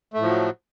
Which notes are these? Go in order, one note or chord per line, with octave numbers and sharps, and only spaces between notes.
A2 F3 F#3 A3